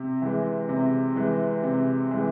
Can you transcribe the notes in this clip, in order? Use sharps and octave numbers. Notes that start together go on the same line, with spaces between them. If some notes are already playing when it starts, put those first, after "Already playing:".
Already playing: C3
E3 G#3
C3
E3 G#3
C3
E3 G#3